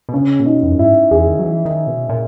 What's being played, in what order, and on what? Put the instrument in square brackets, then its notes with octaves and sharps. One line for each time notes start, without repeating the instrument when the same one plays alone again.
[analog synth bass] B2
[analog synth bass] C#3 [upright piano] C#4
[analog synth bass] A#2
[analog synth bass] B2 [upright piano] D#4
[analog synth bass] E2
F#2
[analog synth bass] G#2 [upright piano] E4
[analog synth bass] E2 [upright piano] G#4
[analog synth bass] D#3
F#3
E3
D#3
B2
A#2